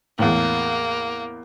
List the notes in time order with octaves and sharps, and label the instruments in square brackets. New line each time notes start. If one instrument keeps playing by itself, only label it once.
[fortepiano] E2 A2 [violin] A#3